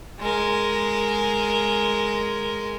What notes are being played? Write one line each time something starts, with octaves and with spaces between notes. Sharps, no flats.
G#3 A#4